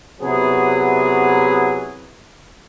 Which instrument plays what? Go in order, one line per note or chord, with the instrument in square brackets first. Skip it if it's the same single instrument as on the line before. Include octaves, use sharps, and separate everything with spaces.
[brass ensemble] C3 F#3 B3 E4 G#4